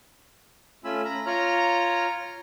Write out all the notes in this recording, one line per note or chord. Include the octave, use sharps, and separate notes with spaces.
A3 C#4 F4 G#5 B5 E6
A#5 B5
F4 C#5 A#5 F6